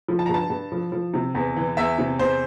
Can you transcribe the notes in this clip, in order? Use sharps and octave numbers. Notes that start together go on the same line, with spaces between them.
F3
A5
A#5
G2 A5
G2
F3
F3
C3
E2
E3
E2 E5
C3
E2 C5